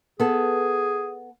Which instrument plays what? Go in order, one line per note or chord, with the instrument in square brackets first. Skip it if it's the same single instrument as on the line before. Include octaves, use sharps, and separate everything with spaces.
[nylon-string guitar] B3 A4 [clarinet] G#4